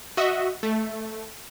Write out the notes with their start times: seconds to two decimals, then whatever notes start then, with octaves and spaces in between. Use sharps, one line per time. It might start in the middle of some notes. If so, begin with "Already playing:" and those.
0.17 F#4 D#5 E5
0.63 A3